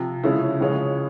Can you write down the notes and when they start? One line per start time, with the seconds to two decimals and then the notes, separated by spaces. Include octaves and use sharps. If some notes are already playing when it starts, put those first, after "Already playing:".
Already playing: C3 F3
0.24 C#3 F3 G#3 C#4 E4
0.60 C#2 C#3 F3 G#3 C#4